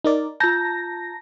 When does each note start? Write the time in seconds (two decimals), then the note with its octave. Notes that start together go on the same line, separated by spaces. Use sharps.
0.04 D#4 A#4 D5
0.40 F4 A5 A#5 G6 A#6